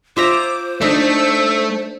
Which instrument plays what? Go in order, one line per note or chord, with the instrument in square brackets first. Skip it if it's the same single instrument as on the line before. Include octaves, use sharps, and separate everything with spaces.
[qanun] F4 E5 A#5 [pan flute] C5 [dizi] D6
[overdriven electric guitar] A3 [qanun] D4 D#4 [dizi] E6